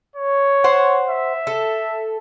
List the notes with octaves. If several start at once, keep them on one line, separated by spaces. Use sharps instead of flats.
C#5
C5 F#5
E5
A4